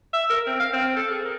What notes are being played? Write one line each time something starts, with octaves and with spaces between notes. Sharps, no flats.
E5
A#4
C4
F5
C4
A4
G#4
A#4